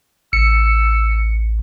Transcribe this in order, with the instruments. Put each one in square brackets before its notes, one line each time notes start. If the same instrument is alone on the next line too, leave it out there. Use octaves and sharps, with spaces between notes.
[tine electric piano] A1 [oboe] E6 [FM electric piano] C#7